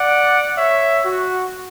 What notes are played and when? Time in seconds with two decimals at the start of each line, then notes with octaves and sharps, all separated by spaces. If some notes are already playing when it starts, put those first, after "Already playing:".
Already playing: D5 F#5
0.58 C#5 E5
1.05 F#4